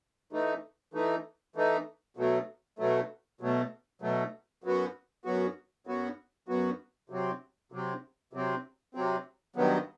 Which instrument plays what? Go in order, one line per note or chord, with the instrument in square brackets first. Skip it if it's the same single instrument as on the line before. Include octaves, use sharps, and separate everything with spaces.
[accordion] E3 A3 D#4
E3 A3 D#4
E3 A3 D#4
B2 F#3 A3
B2 F#3 A3
B2 F#3 A3
B2 F#3 A3
F#2 F#3 B3 F#4
F#2 F#3 B3 F#4
F#2 F#3 B3 F#4
F#2 F#3 B3 F#4
C3 F#3 C4
C3 F#3 C4
C3 F#3 C4
C3 F#3 C4
G2 D#3 F#3 B3